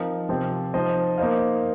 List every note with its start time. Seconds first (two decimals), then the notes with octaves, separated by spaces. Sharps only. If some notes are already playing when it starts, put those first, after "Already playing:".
Already playing: F3 C4 D#4 A#4 F5
0.29 C3 F3 C4 G4
0.74 F3 D#4 C5 D#5
1.18 A#3 D#4 C5 F5